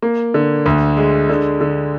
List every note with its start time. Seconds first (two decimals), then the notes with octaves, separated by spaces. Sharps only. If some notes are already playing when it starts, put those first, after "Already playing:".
0.02 A#3
0.34 D3
0.66 D2
0.97 G#3
1.29 D3
1.61 D3